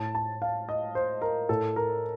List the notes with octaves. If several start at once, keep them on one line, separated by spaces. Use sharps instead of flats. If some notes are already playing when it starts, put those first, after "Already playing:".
Already playing: A2 A5
A5
F5
D#5
C5
A#4
A2 A4
A#4